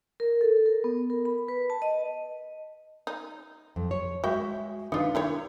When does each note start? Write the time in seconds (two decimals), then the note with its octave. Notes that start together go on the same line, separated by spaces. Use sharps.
0.20 A#4
0.41 A4
0.66 A#4
0.84 B3
1.10 A#4
1.25 B5
1.48 B4
1.70 A5
1.82 D#5
3.07 D#4
3.76 F2
3.91 C#5
4.24 G#3 F#4 E5 G5
4.92 D#3 D4 D#4 F4 B4
5.15 D4 E4 G4 C#5